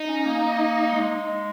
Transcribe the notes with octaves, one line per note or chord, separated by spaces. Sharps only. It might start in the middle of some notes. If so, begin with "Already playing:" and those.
Already playing: D#4
C#4
A#3
G#3